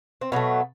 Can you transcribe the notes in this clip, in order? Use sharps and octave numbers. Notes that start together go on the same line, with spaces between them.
C4
B2 F#3 A3 B3